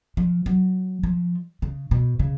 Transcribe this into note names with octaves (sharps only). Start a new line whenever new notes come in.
F3
F#3
F3
C#3
B2
C#3